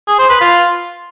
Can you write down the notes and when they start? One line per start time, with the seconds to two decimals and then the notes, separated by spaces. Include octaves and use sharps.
0.08 G#4
0.19 C5
0.30 B4
0.41 F4